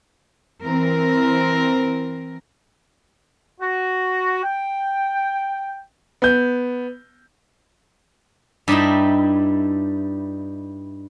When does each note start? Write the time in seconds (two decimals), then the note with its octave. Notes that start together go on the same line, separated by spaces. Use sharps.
0.63 E3 C4 A#4
3.61 F#4
4.43 G5
6.22 B3 G6
8.68 G2 G3 D#4 E4